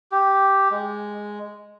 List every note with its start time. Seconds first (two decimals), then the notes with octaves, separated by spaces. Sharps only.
0.12 G4
0.71 G#3